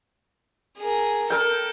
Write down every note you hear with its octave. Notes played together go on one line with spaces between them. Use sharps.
G#4 A#4
A4 A#4 G5